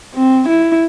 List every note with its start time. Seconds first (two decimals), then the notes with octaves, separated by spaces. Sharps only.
0.14 C4
0.48 E4